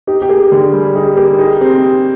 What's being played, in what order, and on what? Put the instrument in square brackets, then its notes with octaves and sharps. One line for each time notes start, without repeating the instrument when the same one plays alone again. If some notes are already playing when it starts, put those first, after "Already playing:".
[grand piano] D#4 [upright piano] G4
[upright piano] G4
[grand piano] A#3 [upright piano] G#4
[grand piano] D3 [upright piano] G#4
[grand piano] G3
[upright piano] G4
[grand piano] D#4 [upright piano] G#4
[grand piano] A#3 [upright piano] G4
[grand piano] D#4 [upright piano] G#4
[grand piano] C4 [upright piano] G4